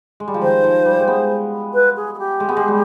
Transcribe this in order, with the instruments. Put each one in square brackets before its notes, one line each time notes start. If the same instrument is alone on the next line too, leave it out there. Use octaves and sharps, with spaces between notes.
[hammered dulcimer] G#3
G3
F3
[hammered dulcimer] D#3 [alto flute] C5
[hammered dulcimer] F3
G3
G#3
B3
[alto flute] B4
G#4
G#4
G4
[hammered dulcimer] G#3
B3
G#3
G3